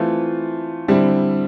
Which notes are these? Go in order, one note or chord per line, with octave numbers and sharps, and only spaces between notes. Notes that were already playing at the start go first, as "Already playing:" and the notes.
Already playing: E3 A3 C4 F4
D3 G3 C4 E4